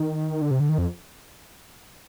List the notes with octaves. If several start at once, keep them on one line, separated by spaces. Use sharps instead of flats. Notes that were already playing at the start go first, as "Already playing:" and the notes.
Already playing: D#3
D3
C3
D3
D#3
F2